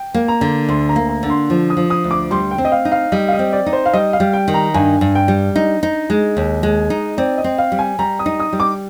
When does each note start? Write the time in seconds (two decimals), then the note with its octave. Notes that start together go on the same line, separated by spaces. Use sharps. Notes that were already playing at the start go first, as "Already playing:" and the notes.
Already playing: G5
0.14 A#3
0.28 A#5
0.41 D3
0.69 D2 C6
0.89 A#5
0.96 A#3
1.09 A#5
1.23 D3
1.30 C6
1.50 F3
1.70 D#6
1.77 F3
1.90 D#6
2.04 D2
2.11 D6
2.31 G3 C6
2.51 G5
2.58 C4
2.65 D#5
2.72 F5
2.85 D#4
2.92 F5
3.12 G3 D#5
3.28 F5
3.33 D#5
3.39 C4
3.53 D5
3.66 D#4
3.73 C5
3.86 F5
3.93 G3 D#5
4.13 F5
4.20 G3
4.33 G5
4.48 D#3
4.54 A#5
4.74 G2 G#5
5.01 G2
5.15 G5
5.28 G3
5.56 D#4 D#5
5.83 D#4
6.10 G#3
6.37 D#2
6.63 G#3
6.90 D#4
7.18 C4 D5
7.38 D#5
7.44 C4
7.58 F5
7.72 G3
7.79 G#5
7.99 G3 A#5
8.19 D#6
8.26 D#4
8.40 D#6
8.53 G3
8.60 D6